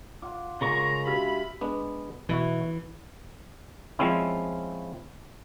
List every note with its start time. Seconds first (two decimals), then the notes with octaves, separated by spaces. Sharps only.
0.22 F4 F#5 D6
0.61 C#3 G#3 F4 A#4 A#5 C#6
1.07 D4 F#4 G4 E5 F5 B5
1.61 G#3 B3 D4
2.29 B2 E3 E4 F#4
3.99 F3 G#3 C4 C#4 E4